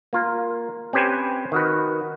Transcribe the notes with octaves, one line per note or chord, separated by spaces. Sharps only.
A#3 F4 A#4
C4 C#4 G4 B4 C5 G#5
D#3 F#4 B4